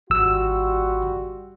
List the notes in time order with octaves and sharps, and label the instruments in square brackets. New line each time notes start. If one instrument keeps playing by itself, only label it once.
[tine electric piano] G#1 E6 [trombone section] G3 F4 F#4